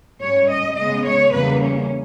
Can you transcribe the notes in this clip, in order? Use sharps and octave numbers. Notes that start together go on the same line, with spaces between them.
G#2 G3 C#4 C#5
D#5
C#3 G#3 B3 D#5
C#5
E2 C#3 E3 G3 A#3 B4
C#4